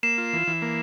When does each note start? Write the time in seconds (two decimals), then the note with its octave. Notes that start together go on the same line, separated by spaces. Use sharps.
0.03 A#3 C7 E7
0.18 F4
0.33 E3
0.47 E3
0.62 A#3